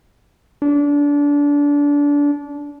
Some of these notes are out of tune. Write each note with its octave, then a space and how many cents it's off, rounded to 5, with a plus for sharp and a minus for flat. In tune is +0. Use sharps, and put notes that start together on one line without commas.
D4 -25